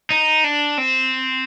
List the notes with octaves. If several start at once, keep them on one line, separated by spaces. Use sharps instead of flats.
D#4
D4
C4